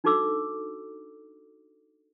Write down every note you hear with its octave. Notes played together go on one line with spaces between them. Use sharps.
D4 D#4 F#4 A4 D6 E6